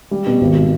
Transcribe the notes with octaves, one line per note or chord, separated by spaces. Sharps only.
G3
B2
G#1